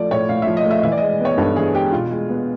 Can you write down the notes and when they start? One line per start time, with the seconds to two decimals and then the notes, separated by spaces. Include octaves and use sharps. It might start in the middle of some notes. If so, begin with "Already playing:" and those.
Already playing: F3 A3 D5
0.11 A2 C#5
0.29 A2 F5
0.42 E5
0.47 F3
0.57 D#5
0.65 A3
0.71 E5
0.78 D#5
0.83 E3 E5
0.92 D5
0.97 D#5
1.01 G#3
1.21 B3 C#5
1.37 G2 A4
1.56 E3 G#4
1.74 G#3 G4
1.92 B2 F4
2.11 G#3
2.29 B3